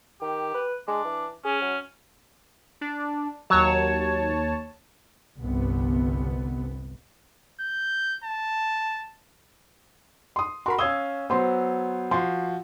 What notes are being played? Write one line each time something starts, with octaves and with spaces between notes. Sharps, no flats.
D#3 G4
B4
G#3 D4
E3
C#4 G#4
F#3
D4
D#2 F#3 C#5 A5
G1 C2 C3 B3
G6
A5
C6 D#6
F#4 A#4 B5 C6
C#4 F5 D#6 E6 G#6 G7
F#3 B3 C5 C6
F3 F#4 C6